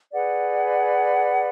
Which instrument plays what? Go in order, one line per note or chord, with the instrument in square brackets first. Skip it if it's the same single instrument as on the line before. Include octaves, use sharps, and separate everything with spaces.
[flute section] G#4 B4 D5 F#5